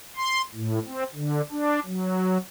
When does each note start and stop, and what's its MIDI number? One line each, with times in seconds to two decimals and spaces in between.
0.16 0.42 84
0.55 0.79 45
0.86 1.04 60
1.15 1.41 50
1.51 1.80 62
1.86 2.38 54